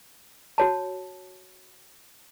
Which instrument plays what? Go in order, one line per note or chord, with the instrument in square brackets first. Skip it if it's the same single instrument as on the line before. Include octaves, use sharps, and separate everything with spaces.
[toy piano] F#4 C#5 A5